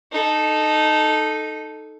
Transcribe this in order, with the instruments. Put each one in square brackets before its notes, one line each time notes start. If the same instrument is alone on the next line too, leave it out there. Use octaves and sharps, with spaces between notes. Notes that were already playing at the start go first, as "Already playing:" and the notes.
[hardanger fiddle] D#4 A4